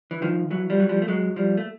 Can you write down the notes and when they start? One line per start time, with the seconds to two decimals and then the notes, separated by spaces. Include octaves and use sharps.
0.11 E3
0.22 D#3 F3
0.51 E3 F#3
0.70 F3 G3
0.80 F#3
0.89 F3 G3
1.02 A3
1.08 F#3 G#3
1.36 F3 G3
1.57 A3